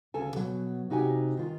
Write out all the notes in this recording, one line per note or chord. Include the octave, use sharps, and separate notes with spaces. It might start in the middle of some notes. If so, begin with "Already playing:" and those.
D2 C#3 A4 G#5
B2 F#3
C3 D#4 F#4 G4 G#5
D#3 F4